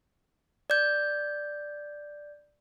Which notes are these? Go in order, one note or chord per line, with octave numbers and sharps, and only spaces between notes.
D5 G6